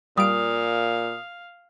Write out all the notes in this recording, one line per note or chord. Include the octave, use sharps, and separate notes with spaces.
A#2 G3 F5 D#6 D7